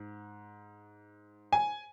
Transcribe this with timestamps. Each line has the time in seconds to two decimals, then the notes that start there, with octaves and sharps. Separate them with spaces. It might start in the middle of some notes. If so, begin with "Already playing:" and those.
Already playing: G#2
1.53 G#5